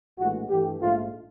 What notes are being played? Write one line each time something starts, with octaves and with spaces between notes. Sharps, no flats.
A#1 A2 E3 G#3 F#4
G2 E3 A3 G4
A#1 G#2 F3 A3 F4